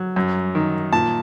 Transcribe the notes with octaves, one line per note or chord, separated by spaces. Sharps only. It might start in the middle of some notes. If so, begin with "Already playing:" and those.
Already playing: F#3
F#2
D#3
A#2 A5